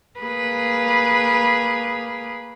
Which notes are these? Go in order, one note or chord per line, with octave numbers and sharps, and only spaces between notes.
A#3 G#4 B4